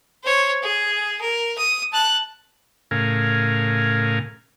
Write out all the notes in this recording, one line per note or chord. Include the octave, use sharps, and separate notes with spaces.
C5 C#5
G#4
A#4
D#6
A5 F#6
A2 C#3 A#4 F5 G#5